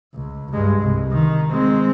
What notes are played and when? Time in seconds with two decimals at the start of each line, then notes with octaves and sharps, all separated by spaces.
0.15 C#2
0.52 G2 G#3
0.83 C2
1.12 D#3
1.51 G#3 C4